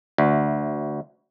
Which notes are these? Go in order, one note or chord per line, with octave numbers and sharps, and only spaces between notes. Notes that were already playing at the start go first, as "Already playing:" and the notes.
D2